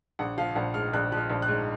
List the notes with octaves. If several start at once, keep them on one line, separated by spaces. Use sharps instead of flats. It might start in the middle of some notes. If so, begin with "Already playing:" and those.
A#1 F#5
F3 F5
A#1 F#5
G#2 F6
A#1 F#6
F3 F#6
F6
A#1
F#6
G#2